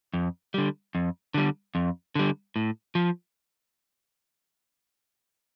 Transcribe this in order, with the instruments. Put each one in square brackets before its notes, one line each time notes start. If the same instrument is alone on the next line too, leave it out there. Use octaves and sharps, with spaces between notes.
[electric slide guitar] F2
D3 G3
F2
D3 G3
F2
D3 G3
A2
F3